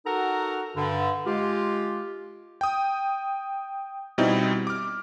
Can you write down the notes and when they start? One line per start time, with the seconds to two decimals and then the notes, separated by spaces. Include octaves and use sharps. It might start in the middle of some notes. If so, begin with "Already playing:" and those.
0.06 D#4 F#4 A4 A#4 F#5 A#5
0.77 G2 D3
1.26 G#3 F4 G4
2.61 G5 D#6
4.18 B2 G3 C4 D#4 E4
4.67 D6 F6